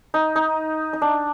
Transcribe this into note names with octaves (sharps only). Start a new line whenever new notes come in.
D#4
D#4
D#4
D4